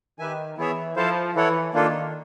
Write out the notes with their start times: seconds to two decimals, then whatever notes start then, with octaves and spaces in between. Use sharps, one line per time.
0.18 D#3 G4 B4 E5 G#5
0.57 E3 B3 E4 G#4 C#5 E5
0.96 F3 E4 A4 C5 F5 A5
1.35 E3 E4 A4 C#5 F#5
1.73 D#3 A#3 D4 F4 A4